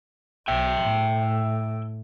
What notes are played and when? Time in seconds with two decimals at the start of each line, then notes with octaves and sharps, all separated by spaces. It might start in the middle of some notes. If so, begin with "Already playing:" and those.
0.48 B1 E5 G5
0.82 A2